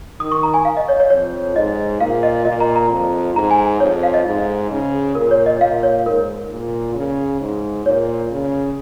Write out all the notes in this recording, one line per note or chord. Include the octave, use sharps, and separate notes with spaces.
D#3 D#6
C#6
A#5
G#5
F5
D#5
C#5
C#5
F2 C#5
G#2 D#5
A#2 F5
D#5
A#2 D#5
A#5
A#5
F2
G#2 A#5
G#5
F2 C#5
F5
D#5
G#2
C#3
A#2 A#4
C#5
D#5
A#2 F5
C#5
G#2 A#4
A#2
C#3
G#2
A#2 C#5
C#3